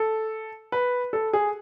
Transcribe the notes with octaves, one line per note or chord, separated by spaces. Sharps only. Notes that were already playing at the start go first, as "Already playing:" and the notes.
Already playing: A4
B4
A4
G#4